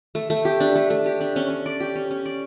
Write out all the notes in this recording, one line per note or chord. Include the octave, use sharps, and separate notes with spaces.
A3
A3
G4
D4
A3
A3
G4
D4
C#4
C#4
D5
G4
C#4
C#4
D5